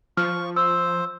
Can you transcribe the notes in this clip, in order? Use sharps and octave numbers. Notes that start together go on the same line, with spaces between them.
F3 C#6 F6
C5 E6